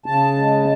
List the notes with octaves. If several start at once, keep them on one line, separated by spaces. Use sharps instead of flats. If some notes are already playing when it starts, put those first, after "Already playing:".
C#3 A5
G#3